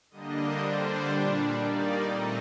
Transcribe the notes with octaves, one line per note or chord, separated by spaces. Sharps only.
D3 G3 A#3 D4 D#5
D3 G3 D4 C5
A#2 G3 D4
D#3 G3 A#3 D#4 D5
A#2 A3 C4 D#4 D#5